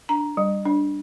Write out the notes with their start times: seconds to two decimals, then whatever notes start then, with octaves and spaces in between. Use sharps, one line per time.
0.09 D4 A#5
0.37 G3
0.65 D4